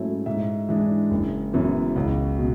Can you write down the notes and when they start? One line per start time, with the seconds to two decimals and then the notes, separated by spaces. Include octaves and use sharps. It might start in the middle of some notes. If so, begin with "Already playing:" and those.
Already playing: G#2 F#3 A3 C#4 E4
0.26 G#2 E5
0.69 E3 G#3 D4
1.11 F#1
1.53 F#2 E3 B3
1.96 C#2
2.38 B2